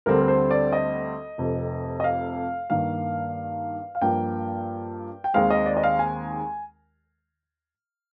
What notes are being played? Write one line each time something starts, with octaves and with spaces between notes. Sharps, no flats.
D2 D3 G3 C4 A#4
A#4
C5
D5
D#5
F1 F2 C3
D#5
F5
G2 D#3 A#3 F5
F5
G2 F3 A#3 G5
G5
D#2 D#3 G#3 C4 F5
D#5
D5
D#5
F5
G#5